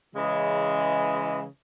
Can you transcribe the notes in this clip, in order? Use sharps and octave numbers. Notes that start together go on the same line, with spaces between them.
C#3 E3 G#3